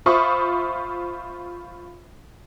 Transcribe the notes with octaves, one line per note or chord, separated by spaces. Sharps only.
F4 C5 E5 B5 C#6 D#6